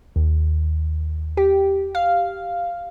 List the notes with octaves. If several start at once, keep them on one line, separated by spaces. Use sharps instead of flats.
D#2
G4
F5